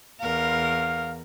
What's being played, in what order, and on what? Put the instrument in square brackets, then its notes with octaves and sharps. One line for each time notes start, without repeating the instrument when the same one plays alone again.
[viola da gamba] E2 A#4 [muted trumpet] F5